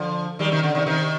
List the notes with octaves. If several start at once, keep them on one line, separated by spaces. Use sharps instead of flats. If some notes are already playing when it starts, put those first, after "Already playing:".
Already playing: D3 F3
D#3 G3
C3 D#3
D3
C3 D#3
C3 D#3